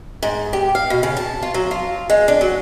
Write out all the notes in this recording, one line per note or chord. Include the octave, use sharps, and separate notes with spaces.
G#2
G4
F5
B2
C#3
A5
F4
F#3
F4
G#3
D4
F#3